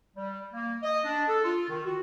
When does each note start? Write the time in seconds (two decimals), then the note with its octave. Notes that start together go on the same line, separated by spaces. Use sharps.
0.17 G3
0.54 A#3
0.83 D#5
1.05 D4
1.29 A4
1.45 F4
1.69 D#3
1.86 F#4